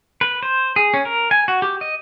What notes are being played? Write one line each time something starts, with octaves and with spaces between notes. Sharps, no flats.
B4
C5
G#4
C#4
A#4
G#5
F#4
G4
D#5